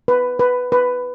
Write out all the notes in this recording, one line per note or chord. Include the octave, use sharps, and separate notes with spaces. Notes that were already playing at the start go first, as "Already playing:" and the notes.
B4
B4
B4